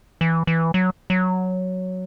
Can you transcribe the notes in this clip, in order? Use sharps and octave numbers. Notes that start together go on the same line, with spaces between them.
E3
E3
F#3
F#3